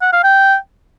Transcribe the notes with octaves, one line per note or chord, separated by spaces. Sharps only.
F#5
F5
G5